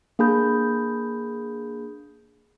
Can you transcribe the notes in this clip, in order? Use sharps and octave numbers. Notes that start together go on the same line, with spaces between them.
A#3 D4 G#4 B5 G6